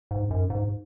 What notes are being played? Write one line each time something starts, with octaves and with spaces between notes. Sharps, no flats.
G#2
F#2
G#2